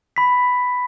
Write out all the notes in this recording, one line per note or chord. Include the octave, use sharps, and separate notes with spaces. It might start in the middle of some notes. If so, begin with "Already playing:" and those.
B5 B6